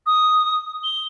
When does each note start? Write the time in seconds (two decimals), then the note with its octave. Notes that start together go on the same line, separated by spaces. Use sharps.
0.06 D#6
0.84 G7